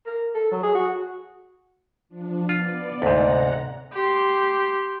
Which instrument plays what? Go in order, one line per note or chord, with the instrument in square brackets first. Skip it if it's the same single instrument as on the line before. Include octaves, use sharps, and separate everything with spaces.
[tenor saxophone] A#4
A4
F#3
G#4
F#4
[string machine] F3 D4
[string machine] B3 D5 [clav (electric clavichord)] F4
[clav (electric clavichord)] D2 G#2 [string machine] C3 F#5 A#5
[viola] G4 C6